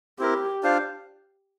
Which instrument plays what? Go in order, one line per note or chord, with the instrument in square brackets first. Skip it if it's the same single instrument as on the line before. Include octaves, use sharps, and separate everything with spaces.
[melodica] C4 E4 A#4 [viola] G4
[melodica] D4 F4 C5 F5